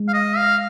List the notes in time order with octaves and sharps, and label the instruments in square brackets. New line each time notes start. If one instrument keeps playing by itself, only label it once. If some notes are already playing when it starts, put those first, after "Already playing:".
Already playing: [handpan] G#3
[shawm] F5
D#5
F5